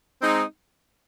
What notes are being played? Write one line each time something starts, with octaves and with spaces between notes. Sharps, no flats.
G#3 C4 D#4